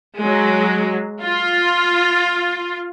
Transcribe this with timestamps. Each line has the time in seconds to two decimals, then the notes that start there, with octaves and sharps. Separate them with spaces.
0.19 F#3 G#3
1.24 F4